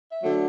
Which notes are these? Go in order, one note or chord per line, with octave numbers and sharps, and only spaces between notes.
E5
D3 F#3 A3